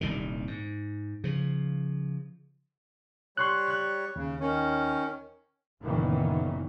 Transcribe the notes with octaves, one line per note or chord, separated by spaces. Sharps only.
D#1 C2 A#2 D#3
G#2
C#3 F3
G3 C#5 C6 C#6 F#6
F#6
D#2 C#3
D#3 C#4
F#1 A#2 D#3 E3 B3 C#4